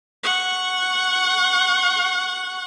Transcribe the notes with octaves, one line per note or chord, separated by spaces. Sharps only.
F#5 C#6